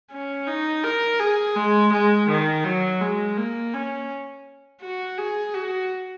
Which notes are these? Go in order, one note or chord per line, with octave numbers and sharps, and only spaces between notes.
C#4
D#4
A#4
G#4
G#3
G#3
D#3
F#3
G#3
A#3
C#4
F#4
G#4
F#4